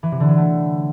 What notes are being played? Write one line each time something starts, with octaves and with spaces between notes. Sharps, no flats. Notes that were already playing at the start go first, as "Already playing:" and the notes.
E3
C3
D3
F#3
A3